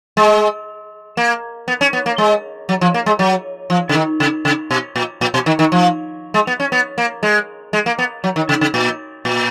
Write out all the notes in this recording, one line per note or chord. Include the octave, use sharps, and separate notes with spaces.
G#3
A#3
B3
C#4
B3
A#3
G#3
F#3
F3
A#3
G#3
F#3
F3
C#3
D#3
C#3
C#3
B2
A#2
A#2
B2
D#3
D#3
F3
G#3
B3
C#4
B3
A#3
G#3
G#3
A#3
B3
F#3
D#3
C#3
C#3
A#2
A#2